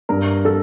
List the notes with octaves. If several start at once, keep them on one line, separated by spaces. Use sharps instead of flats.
G2 A#4
A4